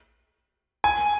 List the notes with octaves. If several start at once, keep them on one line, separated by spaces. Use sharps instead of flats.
G#5